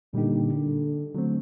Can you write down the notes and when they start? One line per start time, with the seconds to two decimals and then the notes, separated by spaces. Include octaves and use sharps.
0.14 A#2 D3 G3 A#3 D#4 G4
1.14 D3 F#3 A3 C4